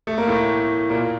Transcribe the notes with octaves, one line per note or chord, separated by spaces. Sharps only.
A3
A#3
A2 A3
A#2 A#3